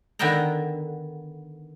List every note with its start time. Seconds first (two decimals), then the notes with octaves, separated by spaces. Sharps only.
0.19 D3 D#3 B3 E5 G5 A#5